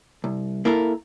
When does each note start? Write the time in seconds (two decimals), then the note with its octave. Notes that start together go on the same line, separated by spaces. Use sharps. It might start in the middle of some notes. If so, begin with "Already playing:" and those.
0.24 C2
0.65 A#3 E4 A4 A#4